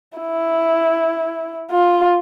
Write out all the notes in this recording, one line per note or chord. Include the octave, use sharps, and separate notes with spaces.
E4
F4